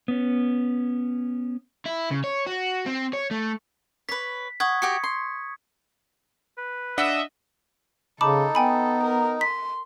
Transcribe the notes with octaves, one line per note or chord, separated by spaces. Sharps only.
B3 C#4
E4
C#3
C#5
F#4
C4
C#5
A3
B4 C#5 B6
F#5 C#6 D#6 G#6
F#4 G4 G5 C#7
C6
B4
D4 D#5 E5 F#5 B6
C#3 D#4 A4 A5 B5 D6
B3 G5 G#5 B5
A#4
C6 B6